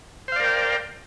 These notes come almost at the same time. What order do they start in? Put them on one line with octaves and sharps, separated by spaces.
C5 F5 D5 A#4 G5